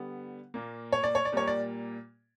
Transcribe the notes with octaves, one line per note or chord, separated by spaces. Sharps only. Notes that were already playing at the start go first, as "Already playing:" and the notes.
Already playing: D3 G3 B3
A#2 A#3
C#5
D5
C#5
D5
A#2 G3 A#3 C#5
D5